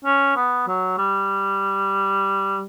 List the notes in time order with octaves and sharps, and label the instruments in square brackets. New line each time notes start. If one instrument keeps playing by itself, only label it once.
[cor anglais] C#4
B3
F#3
G3